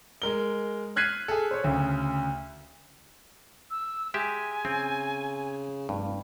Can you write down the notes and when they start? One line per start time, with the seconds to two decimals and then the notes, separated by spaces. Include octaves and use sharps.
0.22 G#3 A#4 G7
0.96 F6 F#6 G#6 B6 C7 D#7
1.28 G#4 A4
1.51 C5 C#5
1.64 D2 C#3
3.71 E6
4.14 G#3 G4 E5 G#5
4.65 C#3 C4
5.89 F1 G2